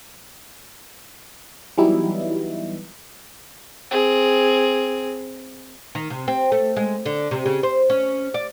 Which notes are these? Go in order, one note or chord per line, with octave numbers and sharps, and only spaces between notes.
E3 F#3 G3 B3 D#4 E4
C4 G#4
D#3
C3
C4
A3
G#3
D3
C3
C#3
C5
C#4
D5